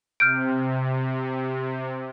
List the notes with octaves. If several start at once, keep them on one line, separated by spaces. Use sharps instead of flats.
C3 F6 G6 D7